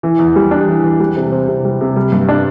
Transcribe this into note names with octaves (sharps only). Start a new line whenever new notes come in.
E3
E2
G3
D4
E3
E2
G3
C3
C4
C3
G3
C3
G3
G2
D4